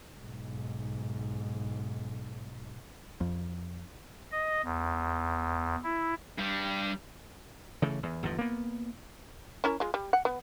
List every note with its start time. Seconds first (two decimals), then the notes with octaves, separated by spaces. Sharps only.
0.19 B1 G#2
3.21 F2
4.32 D#5
4.64 E2
5.84 E4
6.38 G2 G3
7.82 C#3 E3 A3
8.03 E2
8.23 G1 E2 G#2 F3
8.39 A#3 B3
9.64 C#4 E4 A#4
9.80 G#3 F4
9.94 G3
10.13 F#5
10.25 B3